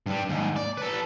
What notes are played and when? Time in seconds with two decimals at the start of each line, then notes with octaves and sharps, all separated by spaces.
0.06 G2 G3
0.29 D#2 G#2
0.56 D5
0.78 A4 B4